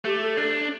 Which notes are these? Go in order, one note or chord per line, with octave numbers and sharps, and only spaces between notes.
A3 G4
A4
D4